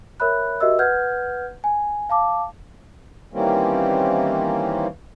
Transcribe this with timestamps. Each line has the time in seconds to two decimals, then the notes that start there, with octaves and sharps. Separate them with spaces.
0.20 A#4 C#5 E5 B5 F#6
0.60 F#4 G4 A#4 D#5 E5 E6
0.78 B4 F#5 F6 G6 G#6
1.64 G#5
2.09 F5 A5 D6
3.33 D#3 E3 G3 A#3 C4 C#4